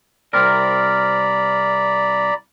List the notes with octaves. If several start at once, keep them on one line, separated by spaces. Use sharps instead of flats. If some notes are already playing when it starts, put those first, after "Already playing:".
C2 C4 A#4 D5 A#5 B5